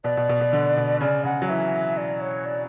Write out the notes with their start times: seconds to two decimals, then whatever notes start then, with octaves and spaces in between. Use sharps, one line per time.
0.04 B2 D5
0.17 B2
0.29 B2
0.41 B2
0.53 D3
0.77 B2
1.01 C#3 D5
1.25 C#3 F#5
1.42 F#3
1.49 E3 E5
1.97 D5
2.21 C#5
2.46 D5